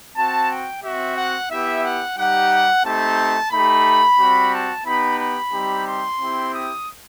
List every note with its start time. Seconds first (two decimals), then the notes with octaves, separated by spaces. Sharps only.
0.16 C4 F#4 A5
0.50 G5
0.83 C4 F#4 E5
1.17 F#5
1.50 B3 E4 G4 E5
1.84 F#5
2.17 G3 D#4 G4 F#5
2.84 A3 C4 D#4 G4 A5
3.51 A3 D#4 G4 B5
4.18 G3 C4 F#4
4.52 A5
4.85 B3 D#4 G4 B5
5.18 B5
5.52 G3 C4 D#4 G4
5.86 C6
6.19 C4 E4 G4
6.53 D#6